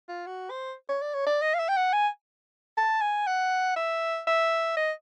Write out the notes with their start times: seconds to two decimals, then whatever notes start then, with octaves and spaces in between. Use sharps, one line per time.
0.08 F4
0.26 F#4
0.50 C5
0.89 C#5
1.02 D5
1.14 C#5
1.26 D5
1.42 D#5
1.54 F5
1.59 E5
1.69 G5
1.77 F#5
1.93 G#5
2.77 A5
3.01 G#5
3.27 F#5
3.76 E5
4.27 E5
4.77 D#5